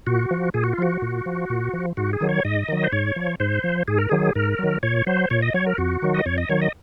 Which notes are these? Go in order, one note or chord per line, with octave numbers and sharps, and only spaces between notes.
A#2 F#4
F3
A#2 G#4
F#4
F4
F3 F#4
A#2
F3
A#2
F3
G#2 F#4
G#4
D#3 F#3
C#5
G#2 D#5
D#3 F#3
C5
G#2 C#5
F3
G#2 C5
F3
G#2 G#4
A#4
D#3 F#3 G#4
G#2 A#4
D#3 F#3
A#2 C#5
F#3 C5
A#2 C#5
D#5
F#3 C#5
A#4
F2 F#4
D#3 F#3
D#5
F2 C#5
D#5
D#3 F#3 C#5
D#5